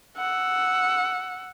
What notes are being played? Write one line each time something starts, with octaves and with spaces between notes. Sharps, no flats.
F#5 E6